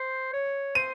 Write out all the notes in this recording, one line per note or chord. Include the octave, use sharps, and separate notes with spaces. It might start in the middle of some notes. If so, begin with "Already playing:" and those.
Already playing: C5
C#5
C5 D#7